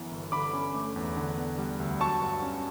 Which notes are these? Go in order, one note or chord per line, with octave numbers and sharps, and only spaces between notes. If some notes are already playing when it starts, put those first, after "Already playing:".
Already playing: F#2 E3 B3
G1
D3 B5 D6
C#4
A3
E2
D3
B3
G3
D2
F#3 A5 C#6
G2
C#4